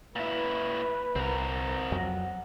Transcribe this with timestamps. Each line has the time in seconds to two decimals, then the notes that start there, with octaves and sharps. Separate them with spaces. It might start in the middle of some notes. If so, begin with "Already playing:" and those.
0.16 A#2 E4 B4
1.16 C2 C4 A#4
1.92 F2 F#3 F#5